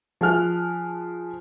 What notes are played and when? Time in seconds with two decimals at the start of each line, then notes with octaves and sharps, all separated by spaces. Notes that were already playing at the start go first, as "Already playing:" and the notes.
0.21 F3 G#4 F6 F#6